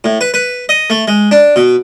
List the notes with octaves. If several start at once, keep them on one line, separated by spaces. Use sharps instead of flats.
A2
B4
B4
D#5
A3
G#3
D4
B2